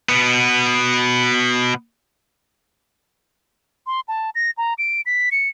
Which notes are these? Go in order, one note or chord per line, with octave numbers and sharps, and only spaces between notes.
B2 B3
C6
A5
A#6
A#5
D7
B6
C#7